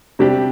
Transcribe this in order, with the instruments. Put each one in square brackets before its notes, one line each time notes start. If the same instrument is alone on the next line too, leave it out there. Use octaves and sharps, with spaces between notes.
[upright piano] C3 G3 D4 G4